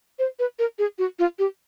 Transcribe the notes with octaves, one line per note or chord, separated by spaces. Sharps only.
C5
B4
A#4
G#4
F#4
F4
G4